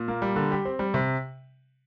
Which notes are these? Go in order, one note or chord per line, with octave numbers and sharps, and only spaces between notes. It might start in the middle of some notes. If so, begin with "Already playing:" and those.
Already playing: A#2
A#3
G3
D3
G4
C4
G3
C3